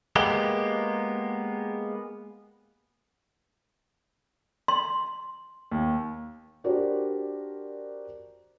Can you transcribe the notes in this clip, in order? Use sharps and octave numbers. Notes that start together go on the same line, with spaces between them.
G#3 A#3 B3 G4
C6
D#2
D4 F#4 G4 A#4 C5 D5